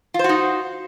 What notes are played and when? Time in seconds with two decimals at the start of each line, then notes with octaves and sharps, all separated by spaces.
0.14 F4
0.19 C5
0.24 F#4
0.29 D#4